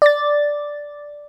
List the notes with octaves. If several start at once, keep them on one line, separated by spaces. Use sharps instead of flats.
D5 A6